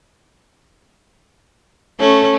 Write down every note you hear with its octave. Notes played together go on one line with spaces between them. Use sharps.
A3 C#4